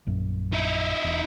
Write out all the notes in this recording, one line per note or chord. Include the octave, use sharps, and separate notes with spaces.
A#1 F#2
D#4 E4
E1